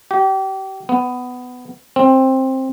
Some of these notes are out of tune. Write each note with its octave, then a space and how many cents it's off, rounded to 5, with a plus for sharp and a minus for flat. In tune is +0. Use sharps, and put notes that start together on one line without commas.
G4 -30
B3 +15
C4 +15